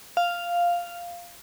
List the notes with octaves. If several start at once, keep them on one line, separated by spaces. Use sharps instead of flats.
F5